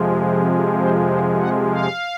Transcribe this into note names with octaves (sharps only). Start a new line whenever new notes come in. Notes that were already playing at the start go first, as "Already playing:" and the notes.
Already playing: F2 C3 F3 G#3
C5
C5
F#5
F5